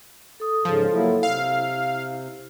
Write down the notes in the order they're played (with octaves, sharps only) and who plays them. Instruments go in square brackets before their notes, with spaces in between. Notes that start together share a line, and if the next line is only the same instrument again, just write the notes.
[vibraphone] A4 D#6
[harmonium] G#2 C#3 [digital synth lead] F3 [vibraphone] A4
[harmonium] F#3 A#3 E4
[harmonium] C3 [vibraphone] E4 [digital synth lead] F5